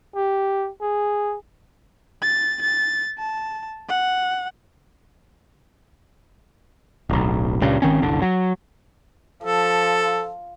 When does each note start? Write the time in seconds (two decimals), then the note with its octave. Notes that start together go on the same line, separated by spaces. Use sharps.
0.15 G4
0.82 G#4
2.22 A6
2.62 A6
3.18 A5
3.89 F#5
7.09 D1 B1
7.62 C#2 G2 A#2 C#3
7.82 G#1 D#3 C4 C#4
8.02 F#1 C2 D3
8.22 F#3
9.44 F3 A4